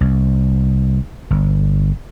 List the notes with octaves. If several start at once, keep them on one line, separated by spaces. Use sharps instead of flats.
C2
G1